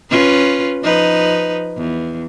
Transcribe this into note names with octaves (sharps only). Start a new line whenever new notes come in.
C#4 F4 B4
F3 D#4 B4
E2